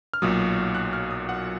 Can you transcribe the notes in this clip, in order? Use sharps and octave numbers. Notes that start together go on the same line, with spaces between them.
F6
B1 A#2 F#3 D#6
F#6
F6
D#6
F#5